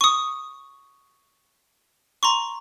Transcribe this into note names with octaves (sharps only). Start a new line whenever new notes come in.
C#6 D#6
A#5 C6 C#6